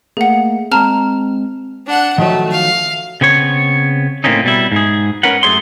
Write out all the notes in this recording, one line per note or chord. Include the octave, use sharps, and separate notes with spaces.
A3 A#3 G#4 F#5
G#3 C4 A5 A#5 F6
D4 F#5
D#3 F3 F#3 A3
F5
C#3 B3 C4 C#5
A2 A#3 C4 C#4 D#4
B2 G3 E4
G#2 G#4
C#4 A#4 B4 F#5
F#2 A3 G#4 C#5 C6